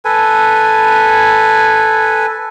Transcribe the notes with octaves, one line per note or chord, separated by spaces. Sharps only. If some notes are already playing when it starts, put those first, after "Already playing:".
A4 B4 G#5